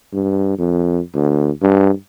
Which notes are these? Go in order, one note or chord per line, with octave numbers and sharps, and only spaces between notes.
G2
F2
D2
G2